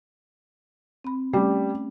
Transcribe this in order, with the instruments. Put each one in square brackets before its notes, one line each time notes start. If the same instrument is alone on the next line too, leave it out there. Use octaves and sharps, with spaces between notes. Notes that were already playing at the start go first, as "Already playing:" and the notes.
[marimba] C4 B5
[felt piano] G3 [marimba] A3 C#4